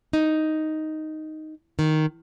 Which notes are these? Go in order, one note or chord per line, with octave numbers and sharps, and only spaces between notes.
D#4
D#3